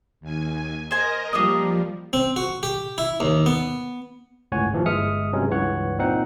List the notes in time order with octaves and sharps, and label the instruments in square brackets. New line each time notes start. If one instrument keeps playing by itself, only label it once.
[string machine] D#2 G#5
[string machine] A#4 D#5 A#5 [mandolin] C5 G#5
[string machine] F3 [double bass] G3 A#3 [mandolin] D4 A#4 D#5
[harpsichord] C4
F#4
G4
E4
D#2
B3
[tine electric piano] G1 C#2 A2 C#5 F#5 G#5
D#2 E3 F3
G1 G#3 E5 D#6 F6 C#7
G2 C3 F#3 G#3 C#4
C#2 G2 E3 C#5 F#5
A#2 C4 D#4 F#5